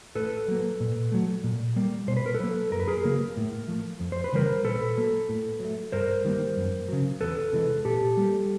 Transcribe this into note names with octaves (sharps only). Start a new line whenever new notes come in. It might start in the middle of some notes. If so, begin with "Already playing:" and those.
A2 A4 B4
F#3 A#3
A#2
F#3 A3
A#2
G3 A#3
B2 C5
B4
A#4
A4 B4
F#3 A#3
F#2 A#4
B4
G#4 A#4
C#3 F#3 A#3
A2
F3 A3
F2
C5
B4
C#3 E3 G3 A#4 C5
A#2 A4 B4
F#3 A#3
A2
F#3 A3
G2 A#4 C5
D#3 G3 A#3
F#2
C#3 F#3
E2 A4 B4
C3 E3 G#3
A#2 G4 A4
G3 A#3